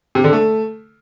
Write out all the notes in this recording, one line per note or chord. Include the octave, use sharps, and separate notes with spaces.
C3
D3
A3